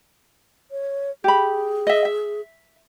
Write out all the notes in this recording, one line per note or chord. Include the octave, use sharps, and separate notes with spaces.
C#5
G4 G#4 B5
D#5 E5
E5